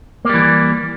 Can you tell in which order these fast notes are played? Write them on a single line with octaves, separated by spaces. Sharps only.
A#3 G3 E3